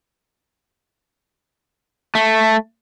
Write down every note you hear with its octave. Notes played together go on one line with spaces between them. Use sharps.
A3